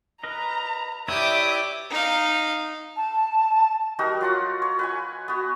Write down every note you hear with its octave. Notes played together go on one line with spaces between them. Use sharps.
A#4 B4 D#5 A#5
E4 G4 B4 C#5 D5 E5 D6 D#6
D#4 F5
A5
G3 D#4 F#4 A#4
F#3 F4 F#5
C#5
B4 F#5 G#5
B3 F#4